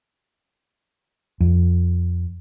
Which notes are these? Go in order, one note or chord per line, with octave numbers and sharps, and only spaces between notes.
F2